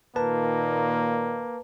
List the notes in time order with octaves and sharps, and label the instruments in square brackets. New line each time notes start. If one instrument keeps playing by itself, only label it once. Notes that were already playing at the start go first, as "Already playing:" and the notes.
[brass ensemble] A#2 D#3 [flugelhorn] A#3 [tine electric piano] B4 A5